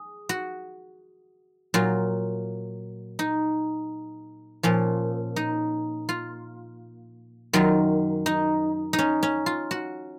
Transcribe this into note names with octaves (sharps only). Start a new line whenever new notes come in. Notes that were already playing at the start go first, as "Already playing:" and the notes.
Already playing: G#4
F#4
A#2 F#3 F4
D#4
A#2 F3 C#4
D#4
F4
F#2 D#3 F#3 F4
D#4
D#4
C#4
C#4
F4
F#4